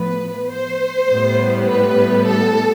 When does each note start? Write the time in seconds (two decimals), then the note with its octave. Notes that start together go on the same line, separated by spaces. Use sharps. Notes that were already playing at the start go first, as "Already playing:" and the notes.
Already playing: A2 F3 B3 B4
0.52 C5
1.10 A2 G3 B3
1.68 B4
2.27 A4